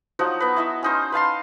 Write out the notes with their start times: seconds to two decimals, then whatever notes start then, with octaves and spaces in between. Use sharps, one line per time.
0.19 F3 F#3 D#4 F#4
0.40 B3 B4
0.56 E4 D#5 E5
0.83 C#4 D#4 C5
1.12 B4 F5 A5 C6